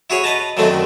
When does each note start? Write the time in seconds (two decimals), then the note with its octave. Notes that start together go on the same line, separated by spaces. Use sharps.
0.10 E4 F#4 G#4 C#5
0.24 B4 D#5 A5 A#5
0.57 F#2 D3 D#3 F#3 A3 C4